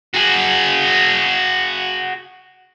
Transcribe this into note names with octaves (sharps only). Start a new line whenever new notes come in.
F#4 G#4